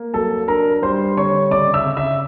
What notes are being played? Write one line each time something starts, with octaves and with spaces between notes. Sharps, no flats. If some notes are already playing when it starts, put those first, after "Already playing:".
Already playing: A#3
F#3 A4 A5
D4 A#4 A#5
G3 C5 C6
D3 C#5 C#6
C#3 D5 D6
E5 E6
C#3
E5 E6